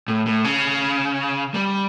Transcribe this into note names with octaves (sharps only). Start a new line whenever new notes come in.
A2
A2
C#3
G3